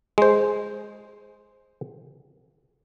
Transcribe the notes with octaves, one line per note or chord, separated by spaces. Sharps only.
G#3 C5